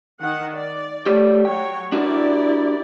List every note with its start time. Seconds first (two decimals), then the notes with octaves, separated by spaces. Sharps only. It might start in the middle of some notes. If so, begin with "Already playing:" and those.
0.20 D#3 F#5
0.55 D5
1.06 A3 G4 C#5 D5
1.45 F#3 C#5 G5
1.92 D4 E4 F#4 G4 A#4 D5